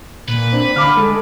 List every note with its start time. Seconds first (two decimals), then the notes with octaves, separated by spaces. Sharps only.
0.28 A#2 B4
0.52 C4 D4
0.76 D3 F5 B5 D6 F6
0.97 G#3 A4